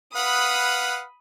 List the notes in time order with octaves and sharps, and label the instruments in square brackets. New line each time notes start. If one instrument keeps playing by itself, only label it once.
[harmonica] B4 F5 F#5 [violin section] B5 D#6